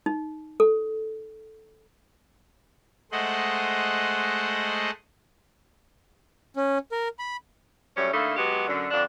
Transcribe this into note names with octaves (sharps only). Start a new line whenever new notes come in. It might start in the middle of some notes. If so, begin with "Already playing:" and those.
D#4
A4
G#3 A3 C5 D#5 F#5
C#4
A#4
B5
F#2 G3 A3 C#4
D3 A3 A#3 D#4 E4
F#3 G#3 B3 F#4 G4
F#2 D3
F2 D3 F3 D4